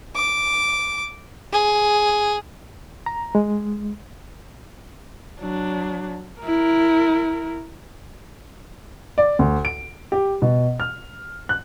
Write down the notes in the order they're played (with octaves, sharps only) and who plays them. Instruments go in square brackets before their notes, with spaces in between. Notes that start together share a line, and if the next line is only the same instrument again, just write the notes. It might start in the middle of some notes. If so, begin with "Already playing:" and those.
[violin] D6
G#4
[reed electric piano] A#5
G#3
[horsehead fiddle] F#3 D4
E4 A#4
[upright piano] D5
D2
D7
G4
B2
F6
F#6